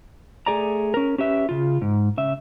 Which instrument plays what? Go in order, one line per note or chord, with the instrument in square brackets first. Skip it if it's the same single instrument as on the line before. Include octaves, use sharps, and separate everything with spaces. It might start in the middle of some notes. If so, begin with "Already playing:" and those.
[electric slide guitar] A3 G#4 D5 A#5
C#4 A#4
C#4 G4 B4 E5
C#3 F4
G#2
C#3 E5